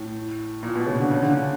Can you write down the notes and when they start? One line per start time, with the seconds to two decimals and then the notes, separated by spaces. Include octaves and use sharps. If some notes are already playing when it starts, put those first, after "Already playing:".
Already playing: A2
0.63 A#2
0.76 B2
0.87 C#3
0.98 D3
1.11 C#3
1.22 D3
1.34 D3